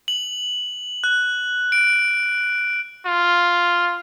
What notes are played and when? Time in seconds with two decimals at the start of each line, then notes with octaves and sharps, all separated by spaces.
0.08 F#7
1.04 F#6
1.72 D7
3.06 F4